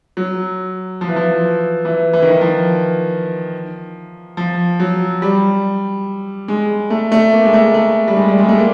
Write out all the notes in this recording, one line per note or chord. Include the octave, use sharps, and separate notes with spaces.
F#3
F3
E3
F3
E3
E3
D#3
E3
F3
F3
F#3
G3
G#3
A3
A3
A#3
G#3
A3
A3
G3
G#3
G3
G#3
A3
A#3